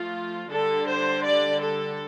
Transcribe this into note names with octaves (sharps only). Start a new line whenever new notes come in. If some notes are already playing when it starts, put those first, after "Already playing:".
Already playing: F3 A3 F4
D3 G3 D4 A4
C5
D5
A4